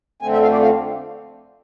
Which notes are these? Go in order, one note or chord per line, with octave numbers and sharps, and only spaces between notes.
F2 D3 A3 C4 G#5
E5
F5
D5
F5